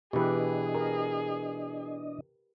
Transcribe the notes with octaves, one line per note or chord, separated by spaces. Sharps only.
B2 E3 D4 G4 G#4 B4 D#5
A#4